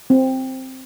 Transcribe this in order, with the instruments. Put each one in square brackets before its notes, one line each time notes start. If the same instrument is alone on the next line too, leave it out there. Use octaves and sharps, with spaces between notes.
[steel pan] C4